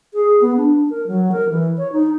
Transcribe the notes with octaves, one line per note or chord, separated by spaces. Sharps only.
G#4
B3
D4
A#4
F#3
A#4
E3
C#5
D#4